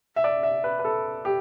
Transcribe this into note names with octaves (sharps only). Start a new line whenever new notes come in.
E5
D5
E5
B4
B4
A4
G4